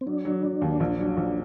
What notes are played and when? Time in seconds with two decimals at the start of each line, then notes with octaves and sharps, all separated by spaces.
0.01 C4
0.06 F#3 D4
0.25 F#3
0.43 F#3
0.62 D#2
0.80 A#1
0.99 F#3
1.17 A#1